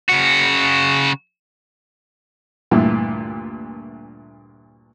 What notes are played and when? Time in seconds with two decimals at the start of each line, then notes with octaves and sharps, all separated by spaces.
0.10 C#3 F#4
2.71 D2 G2 A#2 D3 E3